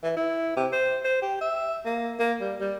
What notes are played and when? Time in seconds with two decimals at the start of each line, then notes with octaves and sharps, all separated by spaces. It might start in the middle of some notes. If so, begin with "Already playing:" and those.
0.03 E3
0.16 E4
0.56 C3
0.72 C5
1.04 C5
1.22 G4
1.41 E5
1.85 A#3
2.19 A#3
2.41 G3
2.60 G3